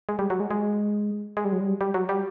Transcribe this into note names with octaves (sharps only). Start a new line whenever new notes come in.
G#3
G3
F#3
G#3
G#3
G#3
G3
F#3
G3
G3
F#3
G3